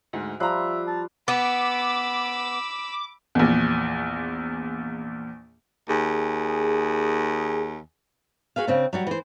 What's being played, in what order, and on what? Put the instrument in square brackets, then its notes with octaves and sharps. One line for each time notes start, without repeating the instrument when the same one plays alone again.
[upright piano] D2 G#2
[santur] F3 G3 F5 [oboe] E5 [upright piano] A#5 F#6
[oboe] A5
[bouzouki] B3 [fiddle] B5 E6 [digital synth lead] D6
[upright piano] A#1 E2
[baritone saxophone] D#2 [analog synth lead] G#4
[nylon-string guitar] F#4 G#4 B4 F5
C#3 C4 D4
F#3 G3 F#4
E3 C5